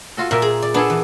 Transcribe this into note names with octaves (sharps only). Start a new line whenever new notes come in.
F4 F#4 A4
A#2 F4 A#4 E5
G#4
D5
B3 D4 G#4 A4
E3